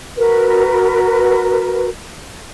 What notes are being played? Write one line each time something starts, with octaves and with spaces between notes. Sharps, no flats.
F#4 A#4 B4